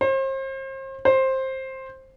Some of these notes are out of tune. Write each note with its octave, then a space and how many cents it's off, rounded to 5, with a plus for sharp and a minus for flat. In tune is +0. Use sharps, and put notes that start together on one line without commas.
C5 +40
C5 +15